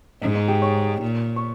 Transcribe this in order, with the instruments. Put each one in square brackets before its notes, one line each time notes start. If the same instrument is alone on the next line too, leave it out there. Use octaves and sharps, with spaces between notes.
[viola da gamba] G#2 [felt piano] D#4 D#5
[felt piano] D#4 D#5
G4 G5
C#5 C#6
[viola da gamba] A#2
[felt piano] C#6